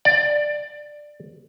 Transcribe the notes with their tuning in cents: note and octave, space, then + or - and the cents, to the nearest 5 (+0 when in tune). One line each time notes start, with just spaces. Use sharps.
D5 +10